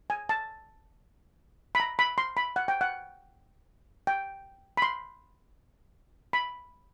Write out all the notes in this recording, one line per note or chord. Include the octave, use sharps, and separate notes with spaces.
G#5
A5
B5
A#5
B5
C6
B5
F#5
G5
F#5
G5
B5
C6
B5